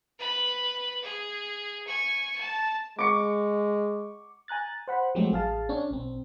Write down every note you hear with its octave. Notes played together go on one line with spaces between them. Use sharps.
B4 B5
G#4
G#5 C#6
A5
G#3 C#6 D6
G#5 A#5 F#6 A6
C5 F#5 B5
F3 F#3 G#3 A3 C4 G4
A1 G#4 F5 A5
C#4 D4 C#5
B1 C4